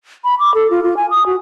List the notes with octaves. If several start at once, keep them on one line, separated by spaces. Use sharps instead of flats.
B5
D6
A4
F4
F4
G#5
D#6
F#4